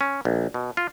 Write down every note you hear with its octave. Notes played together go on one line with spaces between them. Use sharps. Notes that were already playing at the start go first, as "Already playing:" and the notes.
C#4
A#1
B2
F4